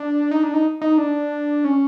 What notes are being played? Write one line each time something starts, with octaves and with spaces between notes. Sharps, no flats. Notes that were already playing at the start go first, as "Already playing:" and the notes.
Already playing: D4
D#4
D4
D#4
D#4
D4
C#4